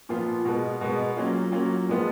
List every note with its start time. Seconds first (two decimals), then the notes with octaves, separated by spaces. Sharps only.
0.09 A#2 F3 B3 F4
0.45 B2 G#3 B3
0.81 B2 G#3 B3
1.16 F#3 A#3 C#4 F4
1.52 F#3 A#3 C#4 F4
1.88 A#2 F3 G#3 B3 F4